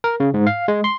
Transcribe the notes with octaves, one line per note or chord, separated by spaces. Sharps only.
A#4
C#3
G#2
F5
G#3
C6